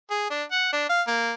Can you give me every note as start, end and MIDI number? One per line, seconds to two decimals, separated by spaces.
0.11 0.29 68
0.31 0.43 62
0.52 0.72 78
0.73 0.89 62
0.89 1.02 77
1.08 1.33 58